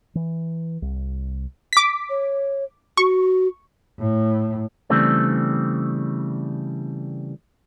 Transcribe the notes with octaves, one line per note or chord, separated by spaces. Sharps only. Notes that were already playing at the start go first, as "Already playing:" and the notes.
E3
C2
D6 B6
C#5
F#4 C#6
A2
C#3 E3 G3 A3 C4 D4